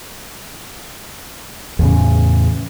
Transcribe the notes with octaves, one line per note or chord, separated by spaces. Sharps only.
E2 A2 C#3